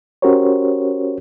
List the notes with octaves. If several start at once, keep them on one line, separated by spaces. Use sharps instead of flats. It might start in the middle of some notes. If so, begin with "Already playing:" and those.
C#4 F#4 G4 A#4 C5 C#5